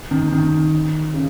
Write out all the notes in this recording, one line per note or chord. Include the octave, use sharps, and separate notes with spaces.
D#3
D#3
C#3